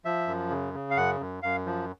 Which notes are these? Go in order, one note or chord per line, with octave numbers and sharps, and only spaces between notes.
F3 E5
F#2
C#3
C#3
F5
F#2 F#5
F#2
F#2 F5
F3